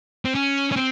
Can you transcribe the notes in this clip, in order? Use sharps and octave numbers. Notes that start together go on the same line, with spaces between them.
C4
C#4
C#4
C4